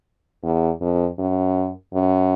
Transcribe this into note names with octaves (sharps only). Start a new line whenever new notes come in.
E2
F2
F#2
F#2